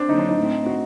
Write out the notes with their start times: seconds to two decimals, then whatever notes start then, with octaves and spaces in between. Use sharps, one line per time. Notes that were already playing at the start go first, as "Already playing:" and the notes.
Already playing: C4 D4
0.09 D#2 D3 F#3 D#4
0.19 D4
0.29 D#4
0.38 A2 A3 C4
0.66 F#4